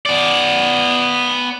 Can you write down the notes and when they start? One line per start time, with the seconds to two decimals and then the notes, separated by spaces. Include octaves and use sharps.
0.06 B3 D5